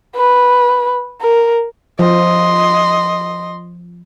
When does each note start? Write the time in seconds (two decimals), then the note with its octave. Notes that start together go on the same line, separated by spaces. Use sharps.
0.15 B4
1.21 A#4
1.99 F3 D#5 C6